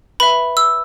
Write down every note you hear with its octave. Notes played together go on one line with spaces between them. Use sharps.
B4 E5 B5
E6